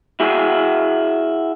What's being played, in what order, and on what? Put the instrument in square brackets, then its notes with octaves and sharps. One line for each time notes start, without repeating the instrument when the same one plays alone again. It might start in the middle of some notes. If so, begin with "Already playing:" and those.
[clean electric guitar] E4 F#4 G#4